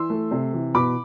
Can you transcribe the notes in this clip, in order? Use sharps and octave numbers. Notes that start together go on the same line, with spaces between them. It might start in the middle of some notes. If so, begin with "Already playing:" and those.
Already playing: E3 C6 E6
A3
C3
E3
B2 B5 D6